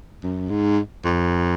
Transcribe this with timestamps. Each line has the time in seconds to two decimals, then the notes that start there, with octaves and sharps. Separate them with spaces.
0.23 F#2
0.49 G#2
1.05 F2